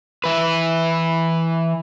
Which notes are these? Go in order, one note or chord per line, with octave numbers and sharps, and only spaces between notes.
E3 B4